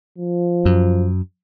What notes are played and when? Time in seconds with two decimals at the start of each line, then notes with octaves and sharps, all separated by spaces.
0.18 F3
0.65 F#2